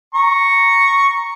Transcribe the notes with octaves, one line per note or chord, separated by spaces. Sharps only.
A#5 C#6